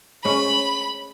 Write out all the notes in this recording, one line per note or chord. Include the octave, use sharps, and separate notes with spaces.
G#3 C#4 B5